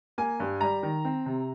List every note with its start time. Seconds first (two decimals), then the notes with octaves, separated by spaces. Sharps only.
0.18 A#3 G#5
0.40 G2
0.61 G3 A#5
0.83 D#3
1.05 C4
1.26 C3